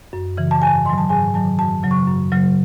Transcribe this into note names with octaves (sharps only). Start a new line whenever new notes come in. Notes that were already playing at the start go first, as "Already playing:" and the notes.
F#2
C#3 E3
A5
G#2 G#5
D#3 F#3 C6
A5
G#2 G#5
D#3 F#3 A5
F#2 A5
C#3 F#3
C#6
F#2
C#3 F#3